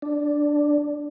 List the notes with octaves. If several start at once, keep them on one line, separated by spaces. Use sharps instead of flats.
D4